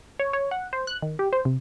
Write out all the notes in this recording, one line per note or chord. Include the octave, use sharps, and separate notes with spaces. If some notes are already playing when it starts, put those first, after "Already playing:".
C#5
C#5
F#5
C5
F#6
D#3
G4
C5
C3